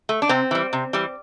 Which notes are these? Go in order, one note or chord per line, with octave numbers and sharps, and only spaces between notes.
A3
D4
C3 C4
E3 G3
C3
E3 G3